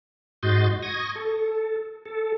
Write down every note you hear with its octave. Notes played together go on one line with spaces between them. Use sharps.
G#2 F#4 D#5 C6 G6 A6
C#6 D#6 G#6 A#6
A4
A4